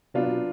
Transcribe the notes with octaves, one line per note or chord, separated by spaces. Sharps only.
C3 F#3 B3 D4 F4
B2